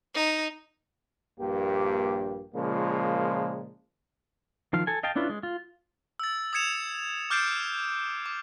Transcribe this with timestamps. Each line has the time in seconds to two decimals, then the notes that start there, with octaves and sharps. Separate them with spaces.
0.15 D#4
1.40 A#1 G2 A#3 G4
2.55 A#2 C#3 F3 G#3 A#3
4.73 D#3 F3 F5
4.87 A4 G#5
5.03 D#5 F5 G5 A5
5.16 C#4 D4 E4 F4 B4
5.30 G#3
5.43 F4
6.19 E6 A6
6.53 D#6 E6 G#6 C#7 E7 F7
7.30 D6 F6 G6 A6 C7 D7
8.26 D6